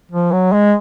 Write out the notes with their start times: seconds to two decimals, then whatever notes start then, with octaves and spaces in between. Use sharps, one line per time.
0.11 F3
0.32 F#3
0.52 G#3